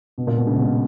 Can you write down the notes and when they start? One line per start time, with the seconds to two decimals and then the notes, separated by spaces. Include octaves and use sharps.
0.18 B2
0.27 A#2
0.37 B2
0.47 C#3
0.58 B2